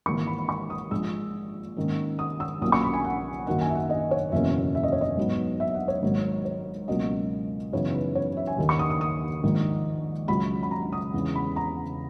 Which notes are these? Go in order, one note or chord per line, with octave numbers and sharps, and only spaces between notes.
G#1 G#2 E3 A#3 C#6
B5
B5
C#6
D#6
A#1 A#2 G#3 E6
G#2 D#3 A#3 C#4
D#6
E6
B1 A#2 A#3 C#4 D#6
C#6
B5
G#5
F#5
F#2 D#3 F#3 A#3 D#4 F#5
G#5
E5
F#5
D#5
C#5
F#1 E2 B2 A#3 C#4 E5
E5
D#5
C#5
D#5
G#2 F#3 B3 D#4
E5
F#5
C#5
G#1 G#2 F#3 A#3
C#5
C#2 B2 F#3 A#3 C#4 D#5
F#2 C#3 E3 B3 D#4 C#5
B4
C#5
E5
G#5
D#2 D#3 A#3
C#6
D#6
D#6
D#6
A#1 G#2 D#3
C#2 C#3 F#3 B5
B5
A#5
D#6
E2 C#3 G#3
B5
A#5